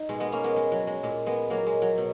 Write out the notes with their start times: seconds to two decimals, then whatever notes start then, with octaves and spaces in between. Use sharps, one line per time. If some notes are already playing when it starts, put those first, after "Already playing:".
Already playing: D#4
0.09 B2 G#3
0.20 G#3 B3
0.32 A#3 C#4
0.44 G#3 B3
0.56 G#3
0.72 F#3
0.87 G#3
1.03 A#2 G#3
1.26 G#3 B3
1.50 F#3 A#3
1.67 G#3
1.82 F#3
1.98 B2